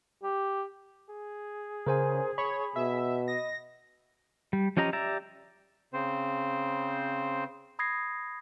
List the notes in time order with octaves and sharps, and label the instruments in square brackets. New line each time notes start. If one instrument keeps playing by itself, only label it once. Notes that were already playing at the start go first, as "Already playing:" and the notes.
[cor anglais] G4
[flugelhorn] G#4
[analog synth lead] C#3 [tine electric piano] A#4 C5 G#5
[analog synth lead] C#5 [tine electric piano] B5
[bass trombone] B2 [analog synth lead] E5
[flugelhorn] D#5 [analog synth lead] A#6
[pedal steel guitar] G3
F3 C#4 G4 D#5 A#5
G4 D5 E5 A#5
[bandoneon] C#3 C4 C5
[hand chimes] B5 D#6 G#6 A#6 C7